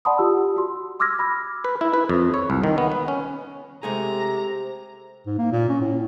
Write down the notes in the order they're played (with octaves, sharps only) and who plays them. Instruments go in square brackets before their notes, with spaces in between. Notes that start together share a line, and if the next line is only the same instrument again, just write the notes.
[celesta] D5 F#5 A5 B5 C6 D#6
F4 G4 E6
F#4 C6
C6 D6 E6 F6 G#6 A#6
B5 D6
[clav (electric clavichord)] B4
E4
B4
F2
C#5
C2
D#3
B3
B4
C#4
[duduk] C3 [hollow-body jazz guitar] G#3 A3 G#4 [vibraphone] G4 C5 [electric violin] A#5
[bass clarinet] G#2
A#3
A#2
C#4
A2